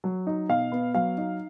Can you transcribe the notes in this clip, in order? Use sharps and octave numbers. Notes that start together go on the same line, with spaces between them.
F#3
D#4
B2 F5
B3
F#3 F5
D#4